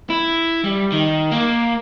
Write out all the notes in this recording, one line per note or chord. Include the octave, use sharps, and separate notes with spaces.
E4
G3
D#3
A#3